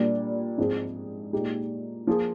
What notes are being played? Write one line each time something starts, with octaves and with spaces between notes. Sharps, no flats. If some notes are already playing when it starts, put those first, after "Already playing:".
Already playing: A#2 G3 A#3 D4
G#2 F3 C4 F4 G#4
A#2 G#3 D#4 G4
F3 A#3 F4 G#4